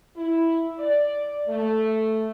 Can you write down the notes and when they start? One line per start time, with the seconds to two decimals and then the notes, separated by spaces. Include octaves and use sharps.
0.16 E4
0.79 D5
1.48 A3